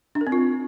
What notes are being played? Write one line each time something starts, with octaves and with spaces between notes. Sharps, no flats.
D4
A#4
C4
F4